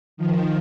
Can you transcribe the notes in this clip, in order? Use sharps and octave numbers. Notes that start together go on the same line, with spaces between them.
D#3 F3